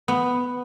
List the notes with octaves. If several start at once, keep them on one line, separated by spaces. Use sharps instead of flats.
B3